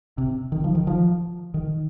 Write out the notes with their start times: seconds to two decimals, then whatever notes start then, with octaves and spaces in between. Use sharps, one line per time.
0.18 C3
0.52 D#3
0.64 F3
0.75 D#3
0.87 F3
1.54 D#3